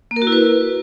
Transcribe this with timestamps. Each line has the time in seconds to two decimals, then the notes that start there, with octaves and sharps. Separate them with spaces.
0.11 A#3
0.16 A#4
0.22 F#4
0.27 E4
0.32 B4